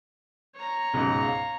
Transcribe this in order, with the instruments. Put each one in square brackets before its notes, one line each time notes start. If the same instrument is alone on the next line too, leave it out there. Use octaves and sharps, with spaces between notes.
[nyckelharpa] C#5 A#5
[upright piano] C#2 G#2 B2
F5